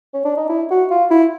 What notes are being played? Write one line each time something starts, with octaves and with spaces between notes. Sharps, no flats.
C#4
D4
D#4
E4
F#4
F4
E4